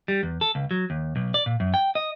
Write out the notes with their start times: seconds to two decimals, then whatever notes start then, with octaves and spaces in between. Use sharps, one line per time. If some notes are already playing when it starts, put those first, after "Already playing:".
0.08 G3
0.23 E2
0.41 A4
0.55 C#2
0.71 F#3
0.90 D#2
1.16 B1
1.34 D5
1.46 A#2
1.60 F#2
1.74 G5
1.95 D#5